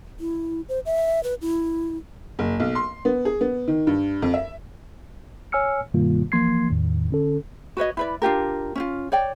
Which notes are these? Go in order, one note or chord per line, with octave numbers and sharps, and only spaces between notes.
E4
C5
E5
B4
E4
F#1
B1
C6
B3
G#4
B3
D#3
G2
F2
E5
C#5 G#5 E6 F6 C#7
G2 B2 D#3 G3 A#3 F4
E3 F3 A#3 C6 G#6 C7
E2 A2 D#3
D3 C#4 A4
F#4 B4 C#5 D#5
E4 B4 D5
D4 F4 G4 A#4
C#4 E4 F4
C#5 D5 G5